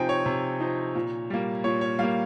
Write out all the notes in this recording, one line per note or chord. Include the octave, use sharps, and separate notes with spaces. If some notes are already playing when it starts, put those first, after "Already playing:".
Already playing: C3 F3 C4 D#4 G5 G#5
C#5
C3
F3 C4 D#4
A#2
G3 A#3
A#2 C#5
C#5
G3 A#3 F5